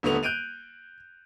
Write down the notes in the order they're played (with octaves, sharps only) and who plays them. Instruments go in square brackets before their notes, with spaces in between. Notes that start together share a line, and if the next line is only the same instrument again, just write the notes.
[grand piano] D#1 D3 A3 B3 F7
F#6 G6 D7 D#7 F7